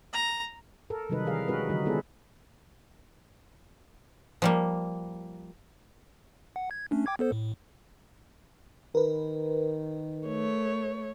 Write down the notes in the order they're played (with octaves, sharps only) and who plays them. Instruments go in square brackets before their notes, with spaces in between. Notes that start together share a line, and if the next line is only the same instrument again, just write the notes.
[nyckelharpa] A#5
[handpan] A4 A#4
C3 D#3 F#3 G3 D#4 B4
D#3 E3 G#4 A#4 F5
G#3 C#4 D#4 F#4 A#4 B4
D3 F#3 G3 D#4
G#3 B3 E4 F4 G#4 A4
[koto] F3 G3 A#3
[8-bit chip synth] F#5
G#6
A3 C#4 D4
G5 D6 G#6
B3 A4 C5
A2
[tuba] D#3 [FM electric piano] A#4 B4
[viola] A3 C#5